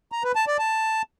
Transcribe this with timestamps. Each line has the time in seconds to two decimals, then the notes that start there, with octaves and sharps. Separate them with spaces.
0.12 A#5
0.24 B4
0.35 A5
0.47 D5
0.59 A5